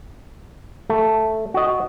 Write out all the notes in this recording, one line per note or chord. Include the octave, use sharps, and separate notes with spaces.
A3
F#4 D#5